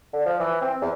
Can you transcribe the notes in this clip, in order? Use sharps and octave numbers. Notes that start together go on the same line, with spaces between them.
D3
F3
E3
C4
E2